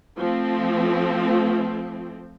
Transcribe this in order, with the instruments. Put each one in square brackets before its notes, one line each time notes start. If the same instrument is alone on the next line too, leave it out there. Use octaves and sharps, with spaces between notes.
[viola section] F3 A3 C4